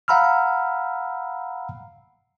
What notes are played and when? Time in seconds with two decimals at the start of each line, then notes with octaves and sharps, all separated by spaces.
0.08 F5 F#5 A#5 B5 E6 F6